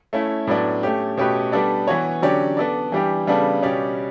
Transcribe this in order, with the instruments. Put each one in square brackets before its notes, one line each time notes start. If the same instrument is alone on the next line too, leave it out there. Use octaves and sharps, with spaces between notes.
[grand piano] A3 C#4 E4
A2 F#3 B3 D4
A3 C#4 G4
B2 A3 C#4 G4 B4
G3 B3 D4 A4 D5
E3 B3 F#4 C#5
D3 F#3 C#4 G4 D5
B3 D4 A4 D5
E3 G3 D4 G4
C#3 G3 B3 D4 A4
B2 G3 C#4 G4 D5